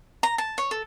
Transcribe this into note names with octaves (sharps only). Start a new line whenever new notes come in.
A#5
A5
C#5
A4